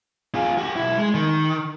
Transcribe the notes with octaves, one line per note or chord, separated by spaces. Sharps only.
F4 G#4
F#4 G4
B1 E4
G#3
D#3